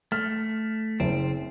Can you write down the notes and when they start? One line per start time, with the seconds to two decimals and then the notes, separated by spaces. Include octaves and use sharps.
0.12 A3 F6
1.00 F#1 C4